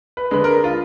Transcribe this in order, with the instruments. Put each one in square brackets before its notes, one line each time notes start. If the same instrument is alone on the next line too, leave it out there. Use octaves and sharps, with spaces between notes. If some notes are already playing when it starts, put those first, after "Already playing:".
[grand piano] B4
D3 G#3 B4
A#4
F4